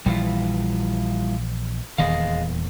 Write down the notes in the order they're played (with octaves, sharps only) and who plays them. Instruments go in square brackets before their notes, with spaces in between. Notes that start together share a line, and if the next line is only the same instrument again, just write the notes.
[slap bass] A#1 E3 [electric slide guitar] G3 E4 F4
[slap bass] D#1 E2 D#3 [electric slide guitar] G#4 D#5 F5